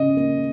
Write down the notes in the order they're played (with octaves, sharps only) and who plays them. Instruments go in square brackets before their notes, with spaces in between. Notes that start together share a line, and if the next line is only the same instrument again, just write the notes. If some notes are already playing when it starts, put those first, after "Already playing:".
Already playing: [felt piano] C#3 C#4 [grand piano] D#5
[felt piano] A#3